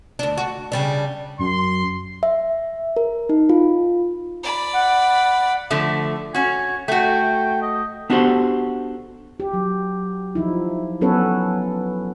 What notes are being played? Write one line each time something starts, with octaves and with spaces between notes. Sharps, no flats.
D2 D4
F#4
C#3 G3 D4
F#2 C6
E5
A#4
D#4
F4
D5 B5
F#5
D3 F3 A3
C#4 F#4 G#5
A3 F#4 G5
D#5
B3 D4 F#4 G4 A4 C5
G4
F#3
F3 D#4 E4
F#3 B3 C#4 A4 B4 C#5